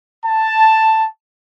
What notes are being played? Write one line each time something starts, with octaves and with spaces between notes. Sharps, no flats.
A5